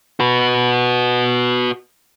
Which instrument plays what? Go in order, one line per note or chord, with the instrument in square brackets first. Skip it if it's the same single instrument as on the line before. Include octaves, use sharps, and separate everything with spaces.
[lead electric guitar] F#4 B4